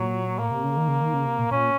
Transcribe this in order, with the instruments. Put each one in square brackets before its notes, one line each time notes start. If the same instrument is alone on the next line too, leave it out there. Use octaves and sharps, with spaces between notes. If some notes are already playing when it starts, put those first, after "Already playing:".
Already playing: [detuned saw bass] A#2 [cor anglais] F#3
[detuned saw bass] A2 [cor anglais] A#3
[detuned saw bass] C3
C#3
D#3
C#3
D#3
C#3
C3
A#2
[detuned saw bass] A#2 [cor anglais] C#4